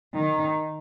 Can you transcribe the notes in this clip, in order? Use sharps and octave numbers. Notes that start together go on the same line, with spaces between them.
D#3